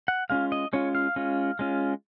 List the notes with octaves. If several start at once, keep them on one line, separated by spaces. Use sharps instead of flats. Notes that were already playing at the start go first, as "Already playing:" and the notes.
F#5
G#3 C#4 F4 F5
D#5
G#3 C#4 F4 C#5
F5
G#3 C#4 F4
G#3 C#4 F4